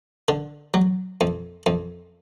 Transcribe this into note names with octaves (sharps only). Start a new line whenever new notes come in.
D3
F#3
F2
F2